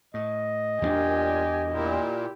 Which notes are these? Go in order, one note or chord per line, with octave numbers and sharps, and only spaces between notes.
A2 D#5
E2 A#2 A#3 D4 G4 G#5
A#2 E4 G4